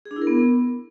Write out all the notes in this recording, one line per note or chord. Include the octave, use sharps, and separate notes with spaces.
G#4
D4
E4
A#4
B3